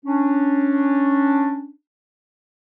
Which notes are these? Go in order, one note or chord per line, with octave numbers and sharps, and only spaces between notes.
C#4 D4